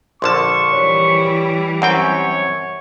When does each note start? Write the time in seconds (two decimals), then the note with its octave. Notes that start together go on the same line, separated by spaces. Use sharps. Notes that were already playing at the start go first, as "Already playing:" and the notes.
0.22 A#1 D3 A5 C6 C#6 F6
0.72 E3 G3 C#5
1.82 F#2 C4 C#5 F#5 G5